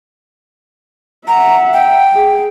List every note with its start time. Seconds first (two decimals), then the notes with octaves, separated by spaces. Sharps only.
1.28 E5 F#5 A#5
1.73 G5
2.13 G#4